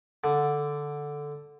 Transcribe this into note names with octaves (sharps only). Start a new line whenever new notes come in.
D3